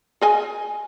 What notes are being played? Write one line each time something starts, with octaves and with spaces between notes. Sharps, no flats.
G#4 D#5 G#5